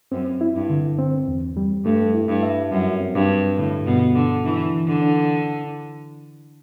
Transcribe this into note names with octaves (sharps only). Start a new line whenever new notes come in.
F#2 C4
E4
G2
D3
C4
E2
G3
G2 A3
E4
G2
E5
F#2 G3
C4
G2
G3
A2 D3
G2 B2
G2 D3
E3 D4
E3
D3
D4